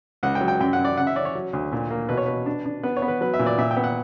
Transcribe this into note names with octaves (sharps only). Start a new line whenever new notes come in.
C#2 F#5
G5
F#3
G5
F#2 G5
F#5
F#2
D5
C#3 F#5
E5
C#4 D5
C#5
F#3
D2
A#2
A#3
B2 B4
C#5
B2 B4
D4
D4
B3 B4
C#5
B3
B4
F#3 B4
E5
A#2
D5
A#2 E5
G5
B3
F#5